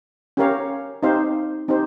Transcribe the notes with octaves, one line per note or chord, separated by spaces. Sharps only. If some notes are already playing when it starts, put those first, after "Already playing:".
C#4 G4 A#4 C#5 F5
C4 D#4 G4 C5 F5
C4 D#4 G4 C5